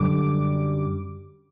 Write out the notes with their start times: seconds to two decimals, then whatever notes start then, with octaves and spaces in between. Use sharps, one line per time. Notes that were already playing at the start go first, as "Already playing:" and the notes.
Already playing: F#2 D3 G3 D6